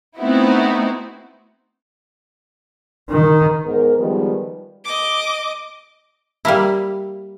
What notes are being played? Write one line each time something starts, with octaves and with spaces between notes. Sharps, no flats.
A3 B3 C4 D#4 E4 F#4
D#3
G#2 B3 A#4
D#3 F3 G3 G#3 B3
D#5 D6
G3 A#3 E4